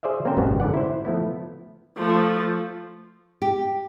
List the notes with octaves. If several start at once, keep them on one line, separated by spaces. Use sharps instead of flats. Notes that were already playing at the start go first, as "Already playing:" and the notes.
G#4 C5 D5 E5 F5
A#3 C4 C#4 A#4 C5 G5
G#1 F#2 B2 G3 B3 F5
G#2 D3 D5 F#5
E4 C5
F3 A3 B3 E4
F3 A3
G4